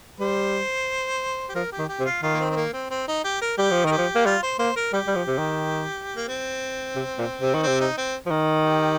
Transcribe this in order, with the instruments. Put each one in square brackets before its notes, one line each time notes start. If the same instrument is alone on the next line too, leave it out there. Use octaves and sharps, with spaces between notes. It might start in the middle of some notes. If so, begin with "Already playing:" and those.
[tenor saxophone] G3 [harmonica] C5
[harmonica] G4
[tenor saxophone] F3 [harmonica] A#4
[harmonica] G4
[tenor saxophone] D#3
[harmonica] G4
[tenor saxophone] C3
[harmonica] F4
[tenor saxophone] D#3 [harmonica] F4
[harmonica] A#3
C4
C4
A#3
C4
C4
D#4
G4
A#4
[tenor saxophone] G3 [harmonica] G4
[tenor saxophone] F3
[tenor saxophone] D#3 [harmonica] A#4
[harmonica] G4
[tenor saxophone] F3
A#3
[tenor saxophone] G3 [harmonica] F4
[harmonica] C5
[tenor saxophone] A#3 [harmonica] C5
[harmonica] A#4
[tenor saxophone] G3 [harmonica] G4
[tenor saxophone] G3
F3
C3
D#3
[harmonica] A#3
C4
[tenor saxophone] C3
A#2
C3
D#3
[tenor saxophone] C3 [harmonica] C4
[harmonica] D#4
C4
[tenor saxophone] F3
D#3
[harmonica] G4